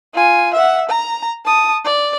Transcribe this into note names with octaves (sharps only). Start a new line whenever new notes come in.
F4 G#5
E5 F#5
A#5
A5 D#6
D5